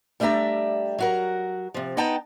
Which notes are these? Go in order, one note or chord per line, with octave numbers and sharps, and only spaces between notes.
G3 A3 D4 G4 E5 A#5
F#3 F#4 A#4
C3 F3
B3 D#4 D#5 G5 A5 A#5